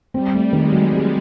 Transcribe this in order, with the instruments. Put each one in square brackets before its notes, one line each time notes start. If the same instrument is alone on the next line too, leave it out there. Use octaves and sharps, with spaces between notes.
[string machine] G3 [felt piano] C4
[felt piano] A3
[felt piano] D#3 [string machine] G#3
[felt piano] F#3
C4